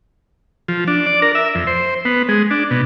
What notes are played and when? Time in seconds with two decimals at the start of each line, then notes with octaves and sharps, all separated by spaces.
0.68 F3
0.88 D4
1.06 D5
1.22 A#4
1.35 E5
1.55 F2
1.67 C5
2.05 B3
2.29 G#3
2.51 D4
2.71 B2